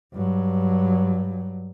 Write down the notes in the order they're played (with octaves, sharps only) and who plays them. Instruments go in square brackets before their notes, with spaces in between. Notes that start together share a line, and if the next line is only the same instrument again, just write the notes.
[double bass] G2 F#3